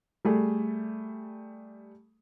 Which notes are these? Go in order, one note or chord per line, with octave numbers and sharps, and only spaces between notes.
G3 A3 G#4